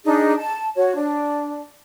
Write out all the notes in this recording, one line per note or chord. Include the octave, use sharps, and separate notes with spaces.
D4 D#4 G#4
A5
F#4 C#5
D4